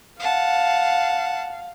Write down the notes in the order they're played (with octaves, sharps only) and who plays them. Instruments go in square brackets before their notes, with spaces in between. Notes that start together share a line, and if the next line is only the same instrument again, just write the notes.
[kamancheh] F5 [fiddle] F#5 A5